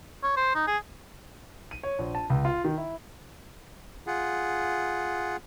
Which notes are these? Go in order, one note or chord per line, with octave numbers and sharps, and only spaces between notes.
C#5
C5
D#4
G#4
D#7
C#5
A#1
A5
C#2
F4
D#3
E4
F4 G#4 F#5